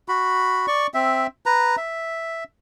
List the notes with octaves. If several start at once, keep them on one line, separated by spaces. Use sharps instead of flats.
F#4 B5
D5 C#6
C4 E5
B4 A#5
E5